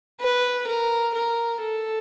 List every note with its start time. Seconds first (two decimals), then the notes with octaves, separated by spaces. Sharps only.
0.20 B4
0.67 A#4
1.15 A#4
1.61 A4